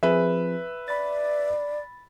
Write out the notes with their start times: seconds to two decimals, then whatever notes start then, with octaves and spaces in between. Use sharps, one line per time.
0.03 F3 C4 G#4 B4 E5
0.88 D5 B5 A6